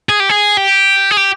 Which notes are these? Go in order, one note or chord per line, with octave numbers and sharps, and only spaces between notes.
G#4
G4
G#4
G4
G#4
G4